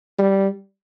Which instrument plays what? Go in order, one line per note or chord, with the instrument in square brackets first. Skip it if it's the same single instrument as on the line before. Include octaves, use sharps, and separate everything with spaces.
[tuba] G3